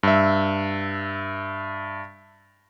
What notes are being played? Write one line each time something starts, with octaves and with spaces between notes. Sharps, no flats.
G2 E5